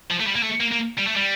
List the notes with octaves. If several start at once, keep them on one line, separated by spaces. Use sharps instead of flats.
F3
A3
G3
A#3
A3
A#3
A#3
G3
A3
G3